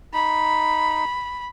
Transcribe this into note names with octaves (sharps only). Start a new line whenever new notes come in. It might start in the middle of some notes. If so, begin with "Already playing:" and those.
D#4 B5